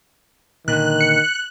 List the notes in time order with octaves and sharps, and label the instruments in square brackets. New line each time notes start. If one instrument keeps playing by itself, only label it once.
[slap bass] A#2 D3 [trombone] D#3 [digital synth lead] F#6
[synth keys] C#7